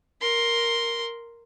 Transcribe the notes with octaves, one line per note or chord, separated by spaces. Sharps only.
A#4 C6